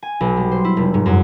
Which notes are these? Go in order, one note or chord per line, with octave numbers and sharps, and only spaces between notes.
G#5
B1
G3
C5
E4
F1
G#2
F#2